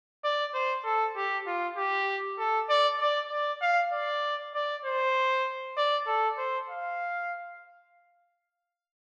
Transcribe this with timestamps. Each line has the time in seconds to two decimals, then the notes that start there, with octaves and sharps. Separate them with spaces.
0.24 D5
0.54 C5
0.85 A4
1.17 G4
1.46 F4
1.77 G4
2.38 A4
2.69 D5
3.00 D5
3.31 D5
3.62 F5
3.93 D5
4.54 D5
4.85 C5
5.77 D5
6.07 A4
6.38 C5
6.69 F5